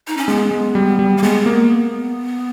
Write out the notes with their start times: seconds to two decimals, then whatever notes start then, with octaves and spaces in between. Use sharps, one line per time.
0.07 D#4
0.17 C#4
0.28 G#3 B3
0.51 G#3
0.75 G3
0.99 G3
1.17 A#3
1.23 G#3 B3
1.46 A#3